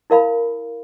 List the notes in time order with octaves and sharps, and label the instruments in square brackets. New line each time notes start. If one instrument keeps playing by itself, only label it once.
[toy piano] E4 A#4 F5 B5